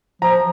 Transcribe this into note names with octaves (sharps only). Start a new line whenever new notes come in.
F3 A#5